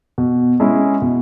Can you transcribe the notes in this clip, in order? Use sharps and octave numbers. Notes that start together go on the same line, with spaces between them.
B2
G#3 C#4 E4 G#4
B2